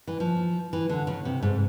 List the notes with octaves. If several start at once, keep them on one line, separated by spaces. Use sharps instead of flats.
E3
F3
E3
D3
C#3
C3
G#2